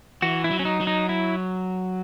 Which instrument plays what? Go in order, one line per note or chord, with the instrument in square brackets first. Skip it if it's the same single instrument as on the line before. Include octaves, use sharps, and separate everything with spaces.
[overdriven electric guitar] E3 [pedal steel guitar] F#4
[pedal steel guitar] E4
[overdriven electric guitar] F#3
[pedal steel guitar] C#4
D#4
[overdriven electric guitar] F#3
[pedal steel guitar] D#4
E4